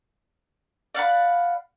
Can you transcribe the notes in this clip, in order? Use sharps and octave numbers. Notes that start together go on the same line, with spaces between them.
D5 F5 F#5 B5